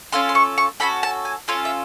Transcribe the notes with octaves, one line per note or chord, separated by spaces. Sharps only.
C#4 F4 A4 C6
C6
C#6
C#6
C#4 F#4 A4 B5
A5
G#5
C#4 F4 A4
E5